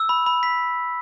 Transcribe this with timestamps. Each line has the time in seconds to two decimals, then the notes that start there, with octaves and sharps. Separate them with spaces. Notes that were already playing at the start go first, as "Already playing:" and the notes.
Already playing: E6
0.09 B5
0.26 B5
0.43 B6